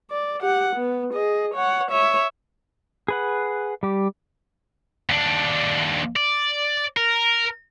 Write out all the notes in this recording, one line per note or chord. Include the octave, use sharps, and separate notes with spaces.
D5
G4 F#5
B3
G#4 D#5
C#5 F#5
C#5 E5
G#4 B4 F#5
G3 G4
D#2 D4
D5
A#4